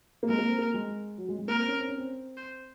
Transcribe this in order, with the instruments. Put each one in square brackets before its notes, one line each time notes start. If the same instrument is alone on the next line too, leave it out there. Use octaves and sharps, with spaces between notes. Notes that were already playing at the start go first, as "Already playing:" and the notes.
[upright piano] A#3
[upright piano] G#3 [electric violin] A#4
[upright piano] A#3
C4
A#3
G#3
F#3
G#3
G#3
[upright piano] A#3 [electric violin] A#4
[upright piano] C4
C#4
C4
C#4
C4
[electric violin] C5